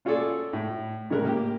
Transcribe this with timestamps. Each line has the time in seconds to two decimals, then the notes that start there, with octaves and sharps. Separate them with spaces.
0.05 C#4 F4 F#4 G#4 A4 D5
0.53 A2
1.10 A2 C#3 G#3 A#4 F#6
1.25 A#3 G4